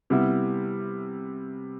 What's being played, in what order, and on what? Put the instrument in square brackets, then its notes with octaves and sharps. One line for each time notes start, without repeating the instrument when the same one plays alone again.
[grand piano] C3 G3 B3 E4